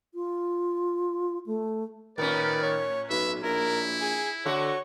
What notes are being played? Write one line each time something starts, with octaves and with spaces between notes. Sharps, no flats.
F4
A3
A2 D#3 C#4 B4 D5
C#5
B1 B4 E5
A#1 E4 A#4
G#4
D3 A3 F#4 C#5